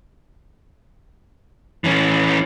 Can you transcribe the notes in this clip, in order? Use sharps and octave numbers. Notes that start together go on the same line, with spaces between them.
E3 C#4